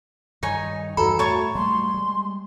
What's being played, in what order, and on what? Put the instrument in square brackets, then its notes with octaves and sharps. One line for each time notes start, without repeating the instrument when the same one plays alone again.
[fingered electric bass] G2 D#3 [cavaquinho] D#4 C#5 G#5
[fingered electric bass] E2 G2 D#3 [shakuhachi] F#4 [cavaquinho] A4 [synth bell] A#5 B5
[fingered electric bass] A2 [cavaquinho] C#5 A5 C#6
[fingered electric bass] G3 A3 A#3 [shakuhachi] C6
[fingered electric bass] G3 G#3